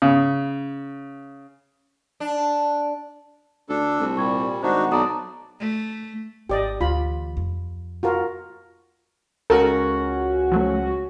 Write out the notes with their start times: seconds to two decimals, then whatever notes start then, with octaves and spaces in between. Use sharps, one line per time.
0.02 C#3
2.20 D4
3.69 D2 D4 A4
4.00 C2
4.17 A#2 G3 C#6 G#6
4.63 G#1 D4 D#4 F#4 C5 D#5 F#5
4.92 B1 B3 D5 A5 A#5 D#6
5.60 A3
6.49 G#1 G4 D5 D#5
6.81 D2 E3 F4 B5
7.37 F2
8.03 F4 F#4 A#4
9.50 C#2 C#4 F#4 A4 A#4
10.52 F3 F#3 A3